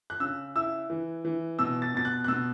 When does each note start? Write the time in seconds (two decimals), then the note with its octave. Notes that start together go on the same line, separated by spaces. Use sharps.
0.10 F#6
0.20 C#3 E6
0.55 E4 E6
0.90 E3
1.25 E3
1.59 B2 E6
1.82 A6
1.94 B2 A6
2.05 F#6
2.24 F#6
2.28 B2 E6